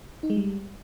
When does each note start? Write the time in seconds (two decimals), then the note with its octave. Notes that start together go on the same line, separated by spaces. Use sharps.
0.23 D#4
0.30 G#3
0.36 G3